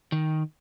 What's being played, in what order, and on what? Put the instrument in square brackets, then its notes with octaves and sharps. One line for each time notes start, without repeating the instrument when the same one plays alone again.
[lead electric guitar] D#3